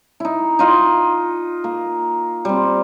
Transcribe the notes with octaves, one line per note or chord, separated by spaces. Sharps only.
D#4 E4
D#4 F4 D#5
A#3
G3 C4